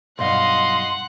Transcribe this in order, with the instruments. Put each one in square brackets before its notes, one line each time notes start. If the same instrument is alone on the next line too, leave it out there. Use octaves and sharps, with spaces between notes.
[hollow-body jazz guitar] B1 G2 [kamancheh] D#5 F5 [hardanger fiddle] F#5 [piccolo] C6